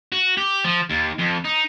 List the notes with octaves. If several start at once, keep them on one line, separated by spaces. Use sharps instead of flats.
F#4
G4
F3
D#2
F2
D#4